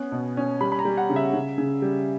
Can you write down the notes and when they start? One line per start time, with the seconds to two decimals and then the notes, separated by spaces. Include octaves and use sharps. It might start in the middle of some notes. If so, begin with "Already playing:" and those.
Already playing: B3 C#4 F#6
0.12 B2
0.37 C#4
0.61 G3 B5
0.72 B5
0.79 A#5
0.85 G3
0.97 F#5
1.10 C#3
1.16 E5
1.33 C#3
1.58 C#3
1.82 G3